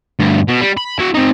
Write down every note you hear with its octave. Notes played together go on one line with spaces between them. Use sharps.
D2 G2
B2
G3
B5
E4 F#4
C4 D#4